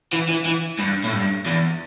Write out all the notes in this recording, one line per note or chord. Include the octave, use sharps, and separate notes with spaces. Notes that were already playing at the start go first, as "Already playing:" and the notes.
E3
E3
E3
G2
A2
G2
E2